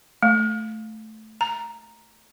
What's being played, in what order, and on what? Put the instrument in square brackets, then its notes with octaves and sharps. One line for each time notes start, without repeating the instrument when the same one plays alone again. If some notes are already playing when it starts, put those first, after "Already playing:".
[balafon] A3
A#5